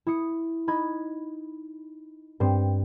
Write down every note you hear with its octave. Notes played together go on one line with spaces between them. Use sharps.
E4 D#6 C#7
D#4 B5 G#6
G2 C4